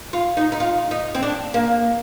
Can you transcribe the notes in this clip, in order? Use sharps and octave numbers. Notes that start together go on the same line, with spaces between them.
F4
D#4
D#4
F4
D#4
C4
D4
A#3